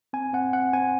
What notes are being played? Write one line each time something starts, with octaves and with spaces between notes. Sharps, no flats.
C4 G#5
C4 F#5
C4 F#5
C4 G#5